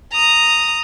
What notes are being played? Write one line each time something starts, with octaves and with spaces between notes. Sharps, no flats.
A#5 D#6